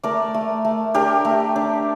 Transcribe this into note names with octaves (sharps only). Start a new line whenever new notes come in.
A3 A#4 D5
A3
A3
D4 G4 A#4
A3
D4